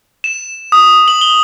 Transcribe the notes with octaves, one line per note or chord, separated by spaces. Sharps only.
E7
D#6
F#7
G7